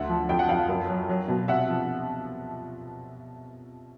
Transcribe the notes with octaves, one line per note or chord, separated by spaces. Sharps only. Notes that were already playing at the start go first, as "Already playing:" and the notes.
Already playing: D2 D3 E5 F#5
F3
F2 G5
F#5
F2 F5 G5
F#2
F#3
F#3
B2
C3 E5 F#5
F3